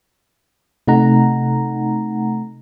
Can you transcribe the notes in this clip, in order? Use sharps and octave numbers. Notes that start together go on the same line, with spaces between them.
C3 A3 D#4 F#5 A#5